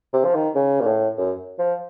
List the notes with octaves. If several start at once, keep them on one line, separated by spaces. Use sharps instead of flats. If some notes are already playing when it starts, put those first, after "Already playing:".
C3
F3
D#3
C#3
A#2
A2
F#2
F3